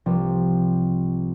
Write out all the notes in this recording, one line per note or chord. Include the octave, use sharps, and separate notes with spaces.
C2 F3 G3